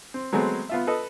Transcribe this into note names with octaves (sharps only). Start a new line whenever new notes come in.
C4
F#3 G#3 A3 B3 C4
B3 F4 E5
A4 B4 D#5